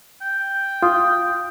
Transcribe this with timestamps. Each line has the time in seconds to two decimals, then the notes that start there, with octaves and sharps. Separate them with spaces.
0.21 G5
0.82 F4 D#6